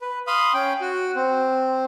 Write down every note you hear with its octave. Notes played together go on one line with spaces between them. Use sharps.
B4
F5 B5 C6 D#6
C#4 G5
F#4
C4